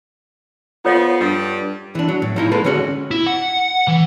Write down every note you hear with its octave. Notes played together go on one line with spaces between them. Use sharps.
F3 B3 F4 A4 C#5
G2 G3
E3 D4
F#3
A2
F3 D#4 E4
G#3 A#3 A4 B4
D3 G#3 C#4 F#4
E4
F#5
E3